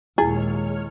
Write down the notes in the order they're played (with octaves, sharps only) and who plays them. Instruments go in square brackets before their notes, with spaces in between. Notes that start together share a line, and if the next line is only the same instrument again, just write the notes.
[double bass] D#2 A#2 [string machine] G#3 C#5 F6 [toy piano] E4 [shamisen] G#4